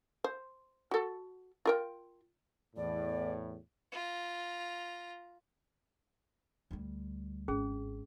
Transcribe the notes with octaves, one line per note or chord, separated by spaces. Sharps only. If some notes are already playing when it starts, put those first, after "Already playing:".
C5
F#4 A4
F4 A#4 G5
E2 A2 D5
F4 A#5
D2 G3
G#1 C#4 G#4